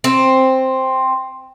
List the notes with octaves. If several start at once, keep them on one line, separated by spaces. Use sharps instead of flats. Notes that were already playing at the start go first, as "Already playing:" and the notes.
C4